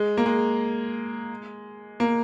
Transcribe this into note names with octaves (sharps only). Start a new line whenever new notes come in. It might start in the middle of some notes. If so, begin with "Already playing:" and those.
Already playing: G#3
A#3
G#3
A#3